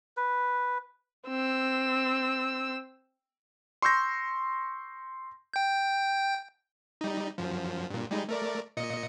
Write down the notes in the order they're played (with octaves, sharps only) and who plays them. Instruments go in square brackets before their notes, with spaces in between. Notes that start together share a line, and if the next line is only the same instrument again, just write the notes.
[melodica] B4
[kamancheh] C4 E6
[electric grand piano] C6 C#6 E6 G6 A#6
[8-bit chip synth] G5 G6
G3 D#4
F#2 F3
G2 A#2
G3 G#3 D#4
A3 A#4 D5
A#2 D#5 C#7